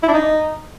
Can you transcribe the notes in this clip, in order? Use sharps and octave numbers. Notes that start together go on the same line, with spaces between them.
E4
D4
D#4